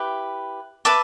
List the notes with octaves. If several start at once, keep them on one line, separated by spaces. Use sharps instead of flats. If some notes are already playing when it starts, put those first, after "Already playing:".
Already playing: E4 G4 B4
B4 E5 A5 D6